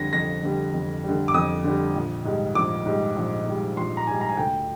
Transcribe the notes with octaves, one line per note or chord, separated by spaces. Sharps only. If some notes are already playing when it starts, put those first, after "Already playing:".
Already playing: F2 D3 G3 A#6
F2 A#6
D3 G3
F2
D3 G3
D6
F2 D#6
D3 G3
A#1
G#2 G3
A#1 D6
G#2 G3
A#1
G#2 G3
A#1 C6
A#5
G#2 G3 G#5
A#5
G#5
D2 G5